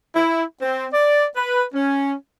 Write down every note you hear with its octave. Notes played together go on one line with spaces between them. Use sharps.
E4
C4
D5
B4
C#4